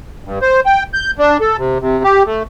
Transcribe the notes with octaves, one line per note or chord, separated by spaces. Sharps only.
G2
C5
G5
G6
D4
A4
C3
C3
G4
A3